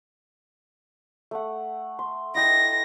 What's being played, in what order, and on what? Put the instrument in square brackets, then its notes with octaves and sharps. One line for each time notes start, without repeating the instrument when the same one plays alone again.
[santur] A3 F#5
C6
[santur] E4 D#5 G5 [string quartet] A#6